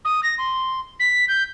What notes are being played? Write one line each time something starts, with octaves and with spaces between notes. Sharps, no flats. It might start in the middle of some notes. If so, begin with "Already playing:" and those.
D#6
A#6
C6
B6
G6